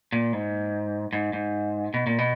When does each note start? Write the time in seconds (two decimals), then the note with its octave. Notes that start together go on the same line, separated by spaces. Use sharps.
0.12 A#2
0.33 G#2
1.13 G#2
1.33 G#2
1.94 B2
2.07 A#2
2.18 B2